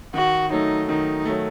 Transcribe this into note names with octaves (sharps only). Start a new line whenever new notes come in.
D#3 F#4
F#3 A3 D#4
D#3 D#4
F#3 A3